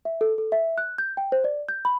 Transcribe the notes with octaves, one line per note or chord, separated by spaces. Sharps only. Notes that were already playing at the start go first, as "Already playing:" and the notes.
E5
A4
A4
E5
F#6
G6
G5
C5
D5
G6
B5